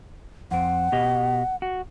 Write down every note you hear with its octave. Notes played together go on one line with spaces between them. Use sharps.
F2 C4 F#5
B2 G4 D#5
F#4